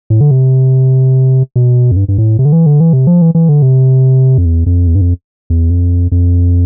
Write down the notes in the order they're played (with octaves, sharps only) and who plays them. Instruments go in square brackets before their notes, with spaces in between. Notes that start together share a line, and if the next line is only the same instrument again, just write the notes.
[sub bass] A2
D3
C3
B2
F2
G2
G2
A2
C3
D3
E3
D3
E3
C3
F3
E3
E3
D3
C3
F2
E2
F2
E2
G2
F2
E2
F2
F2